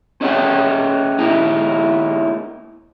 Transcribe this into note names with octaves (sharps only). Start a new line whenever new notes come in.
C#4 G#4 D#5 E5 F#5 G5
A#3 D#4 E4